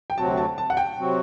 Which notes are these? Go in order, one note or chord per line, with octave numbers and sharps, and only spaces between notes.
G5
D2 C3 F#3 C4 F#4 A5
A5
A5
F#5
G5
C3 F#3 C4 F#4